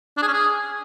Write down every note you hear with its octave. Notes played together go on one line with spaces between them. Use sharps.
D4
G#4
C#4
G#4